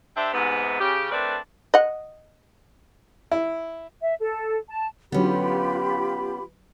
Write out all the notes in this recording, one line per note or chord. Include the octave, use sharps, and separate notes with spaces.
D4 G4 C5 E5
G#2 C3 B3
C#3 G4
A3 C4 D4 A#4 B4 D5
D#5 F#5
E4
E5
A4
A5
D3 F#3 B3 C#4 F4 G4 B5